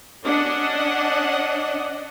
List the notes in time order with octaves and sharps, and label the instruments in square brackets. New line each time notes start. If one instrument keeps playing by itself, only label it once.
[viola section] C#4 D4 D#5 F#5